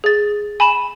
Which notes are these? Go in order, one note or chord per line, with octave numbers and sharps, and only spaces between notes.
G#4 A6
G#5 B5 E7